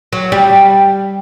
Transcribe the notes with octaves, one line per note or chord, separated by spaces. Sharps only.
F#3
G3